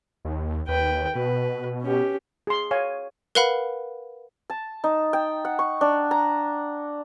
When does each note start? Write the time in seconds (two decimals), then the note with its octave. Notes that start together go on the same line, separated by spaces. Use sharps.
0.25 D#2
0.68 D#2 B4 G5
1.15 B2 B4
1.82 C#4 G4
2.47 G#4 C6
2.71 C#5 F5 G#5
3.35 A#4 B4 F5 F#5 B5
4.50 A5
4.84 D#4
5.13 G5
5.45 F#5
5.59 C#6
5.81 D4
6.11 A#5